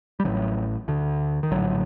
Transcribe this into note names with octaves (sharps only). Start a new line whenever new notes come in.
G3
A1 A2 D3 F#3
D2 D3
D#3
A#1 A2 D3 F#3